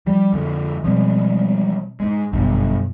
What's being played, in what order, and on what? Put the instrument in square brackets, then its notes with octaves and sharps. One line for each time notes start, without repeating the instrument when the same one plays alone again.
[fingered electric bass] F3 [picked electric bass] G3
[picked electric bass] F2 D3
[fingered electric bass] B2 C4 [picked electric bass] F3 G3 G#3
[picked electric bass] G#2 G#3
[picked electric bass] G1 [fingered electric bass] F#2 B2 F#3